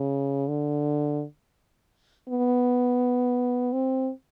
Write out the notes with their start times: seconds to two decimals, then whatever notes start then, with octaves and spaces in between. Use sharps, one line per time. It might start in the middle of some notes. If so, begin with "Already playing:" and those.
Already playing: C#3
0.48 D3
2.28 B3
3.72 C4